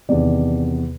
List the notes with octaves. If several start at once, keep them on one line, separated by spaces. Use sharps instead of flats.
E2 C3 D#3 D5